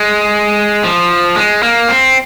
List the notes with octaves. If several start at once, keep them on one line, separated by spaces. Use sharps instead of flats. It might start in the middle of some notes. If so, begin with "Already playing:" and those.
Already playing: G#3
F3
G#3
A#3
C4